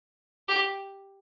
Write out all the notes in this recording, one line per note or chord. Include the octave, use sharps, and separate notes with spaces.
G4